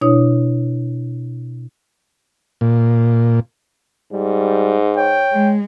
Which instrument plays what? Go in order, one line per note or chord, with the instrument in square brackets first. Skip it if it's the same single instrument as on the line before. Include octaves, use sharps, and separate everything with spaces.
[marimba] B2 D4 E4 C#5 D#6
[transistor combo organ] A#2
[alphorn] G#2 [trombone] G3
[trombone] C#5 [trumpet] G5
[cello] G#3